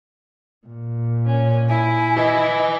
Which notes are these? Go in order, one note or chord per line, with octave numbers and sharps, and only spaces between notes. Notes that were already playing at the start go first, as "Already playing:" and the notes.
A#2
C#4
E4 G#5
B4 D#5 G#5